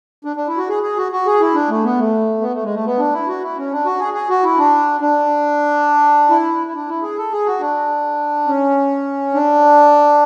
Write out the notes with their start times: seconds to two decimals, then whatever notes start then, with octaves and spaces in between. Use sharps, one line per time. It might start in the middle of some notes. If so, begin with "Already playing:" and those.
0.25 D4
0.36 D4
0.47 E4
0.57 F#4
0.69 G#4
0.83 G#4
0.97 F#4
1.12 F#4
1.26 G#4
1.40 E4
1.54 D4
1.69 A3
1.84 B3
1.99 A3
2.41 B3
2.53 A3
2.63 G#3
2.74 A3
2.85 B3
2.99 D4
3.13 E4
3.27 F#4
3.42 E4
3.57 C#4
3.72 D4
3.85 F#4
3.99 G#4
4.14 G#4
4.29 F#4
4.44 E4
4.58 D4
5.00 D4
6.30 E4
6.67 E4
6.75 D4
6.89 E4
7.02 G#4
7.18 A4
7.32 G#4
7.46 F#4
7.60 D4
8.47 C#4
9.34 D4